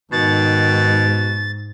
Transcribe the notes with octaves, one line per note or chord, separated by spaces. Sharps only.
G#2 B2 D#3 A6